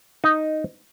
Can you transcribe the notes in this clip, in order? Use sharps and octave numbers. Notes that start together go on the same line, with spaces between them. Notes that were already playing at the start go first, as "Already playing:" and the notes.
D#4